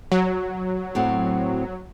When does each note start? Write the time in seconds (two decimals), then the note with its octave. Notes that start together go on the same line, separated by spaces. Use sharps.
0.12 F#3
0.95 A2 C4 F#5